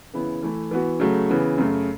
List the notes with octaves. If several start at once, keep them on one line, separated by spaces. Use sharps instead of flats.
C#3 E3 B3 E4
E3 A3 E4
E3 B3 F#4
C#3 F#3 A3
C#3 E3 B3
F#2 C#3 A3